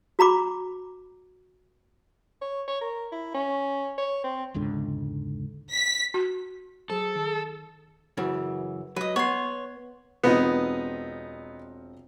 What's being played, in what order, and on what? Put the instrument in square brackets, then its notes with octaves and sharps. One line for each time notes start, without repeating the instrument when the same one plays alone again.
[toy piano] F#4 A#5 B5 D6
[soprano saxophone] C#5
C#5
A#4
E4
C#4
C#5
C4
[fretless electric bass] E1 C#2 G#2 D3
[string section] B6
[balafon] F#4
[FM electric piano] F#3 C5 [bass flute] G#4 [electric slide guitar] A4
[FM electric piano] D#3
[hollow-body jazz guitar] F#2 C#3 E3
[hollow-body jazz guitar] F#3 [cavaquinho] B4 D#5
[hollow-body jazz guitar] B3 [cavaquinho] C#5 C6
[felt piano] E1 C4 F4 [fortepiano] B3 D#4